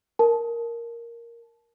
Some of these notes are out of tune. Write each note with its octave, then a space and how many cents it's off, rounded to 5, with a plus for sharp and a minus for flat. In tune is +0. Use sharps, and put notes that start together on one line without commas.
A#4 +0 A5 -20